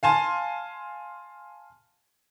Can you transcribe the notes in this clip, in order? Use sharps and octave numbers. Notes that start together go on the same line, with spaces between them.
F5 G#5 A5 C6